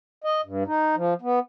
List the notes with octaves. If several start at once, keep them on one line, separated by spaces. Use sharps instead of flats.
D#5
G2
D#4
F3
B3